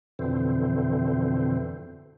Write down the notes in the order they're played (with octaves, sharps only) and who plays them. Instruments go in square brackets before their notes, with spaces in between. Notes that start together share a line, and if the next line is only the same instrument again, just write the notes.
[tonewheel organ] F2 B2 D3 E3 C4